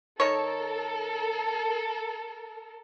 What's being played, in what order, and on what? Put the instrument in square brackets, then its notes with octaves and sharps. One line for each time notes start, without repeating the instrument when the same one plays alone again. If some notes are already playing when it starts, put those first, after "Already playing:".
[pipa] D#3 C#5 [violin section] A4 A#4